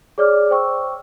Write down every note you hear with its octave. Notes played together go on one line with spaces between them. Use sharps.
G#4 C#5 D5 D6 F6
C5 G5 C#6 E6